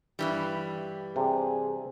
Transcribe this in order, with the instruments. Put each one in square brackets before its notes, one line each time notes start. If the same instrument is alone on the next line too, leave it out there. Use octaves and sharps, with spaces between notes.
[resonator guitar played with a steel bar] G2 E3 G3
[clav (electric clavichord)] C3 D4 [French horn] G#4